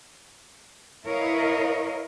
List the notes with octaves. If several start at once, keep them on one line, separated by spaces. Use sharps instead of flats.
E4 A#4 B4 C#5 D#5 F5